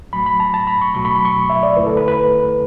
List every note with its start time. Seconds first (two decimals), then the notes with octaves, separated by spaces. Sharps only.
0.13 A2 F#3 A3 B5
0.26 B5
0.40 A5
0.54 A5
0.67 B5
0.81 C#6
0.95 C#2 B2 F#3 A3 C#6
1.05 B5
1.15 B5
1.25 C#6
1.50 E5
1.63 D5
1.77 E2 D3 A3 E4 B4
1.87 A4
1.97 B4
2.08 B4